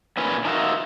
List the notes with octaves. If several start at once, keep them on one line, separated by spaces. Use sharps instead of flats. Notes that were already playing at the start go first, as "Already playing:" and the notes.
A#2 D3 E3 C#4 B4
D4 D#4 F4 F#4 A#4 E5